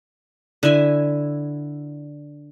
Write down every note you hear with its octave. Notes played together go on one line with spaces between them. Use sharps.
D3 E4 E5 G#5